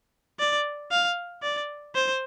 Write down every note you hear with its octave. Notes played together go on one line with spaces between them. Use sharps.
D5
F5
D5
C5